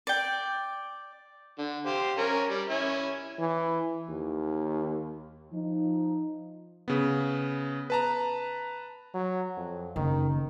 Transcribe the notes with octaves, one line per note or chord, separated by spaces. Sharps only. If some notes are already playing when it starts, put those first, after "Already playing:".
D5 G5
D3
G4 C5 F5
C#4 A#4
G3
C#4 E4
E3
D#2
F3 D#4
C#3 B3
B4 A5 A#5
F#3
F2
F#1 D#3